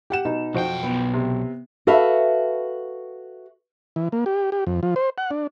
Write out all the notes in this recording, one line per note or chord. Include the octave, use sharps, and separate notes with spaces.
G4 F#5 E7
B2 D#4
B1 F2 F#4 C5 G5
B3
C3
F#4 A4 B4 E5 F5
E3
A#3
G4
G4
F2
F3
C5
F#5
D4